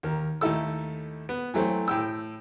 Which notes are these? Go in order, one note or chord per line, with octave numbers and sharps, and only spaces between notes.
D#2 A#4
D#2 A3 D#4 E4 A4 E6
B3
E3 F#3 A3 C4
A2 G5 E6